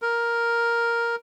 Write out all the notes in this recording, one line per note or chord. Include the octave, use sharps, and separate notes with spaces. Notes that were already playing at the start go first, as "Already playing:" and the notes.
A#4